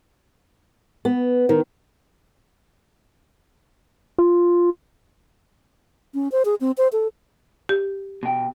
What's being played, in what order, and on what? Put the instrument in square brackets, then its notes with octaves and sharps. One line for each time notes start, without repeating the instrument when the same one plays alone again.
[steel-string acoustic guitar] B3
D#3
[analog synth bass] F4
[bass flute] C#4
C5
G#4
C4
C5
A4
[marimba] G4
[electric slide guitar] B2 G5